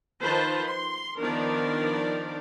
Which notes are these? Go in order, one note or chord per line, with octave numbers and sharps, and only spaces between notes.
D#3 F3 F4 B4 C5 A5
C6
D#3 F3 B3 D4 A#4 D5